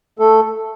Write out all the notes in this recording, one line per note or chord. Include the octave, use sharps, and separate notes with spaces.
A3 A4